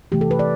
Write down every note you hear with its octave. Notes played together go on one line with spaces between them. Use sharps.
C3 E3 A3 G4
A4
B4
D5